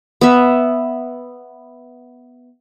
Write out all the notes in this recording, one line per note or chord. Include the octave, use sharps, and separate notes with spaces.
B3 E5